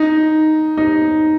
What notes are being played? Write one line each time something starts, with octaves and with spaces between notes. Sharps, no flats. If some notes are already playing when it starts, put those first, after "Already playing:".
Already playing: D#4
D#4